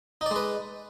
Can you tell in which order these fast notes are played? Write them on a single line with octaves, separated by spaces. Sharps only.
D#4 D5 G#3 B4